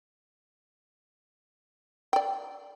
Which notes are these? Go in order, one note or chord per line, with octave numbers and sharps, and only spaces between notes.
D5 G5